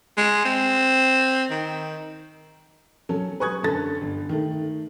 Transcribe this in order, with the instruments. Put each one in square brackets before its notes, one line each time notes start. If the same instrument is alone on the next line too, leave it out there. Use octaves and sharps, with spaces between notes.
[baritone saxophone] G#3
C4
D#3
[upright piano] F#3 C#4 A4
B4 G#5 C#6 D#6 F#6 G#6
F#2 D3 A4 A6
G1
D#3 A3